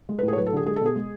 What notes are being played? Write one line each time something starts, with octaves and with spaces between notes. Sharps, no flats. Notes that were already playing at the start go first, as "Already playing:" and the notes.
G#3
B4
A2
G#4
C#5
F#3 B4
A4
D3 G#4
G#3 G#4
A4
B2 G#4
G#3